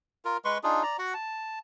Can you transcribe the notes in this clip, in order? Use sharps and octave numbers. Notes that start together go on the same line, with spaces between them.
F4 A#4
G#3 B4 C6 C#6
D4 D#4 F4 G#4
D5 A#5
F#4 F#5
A5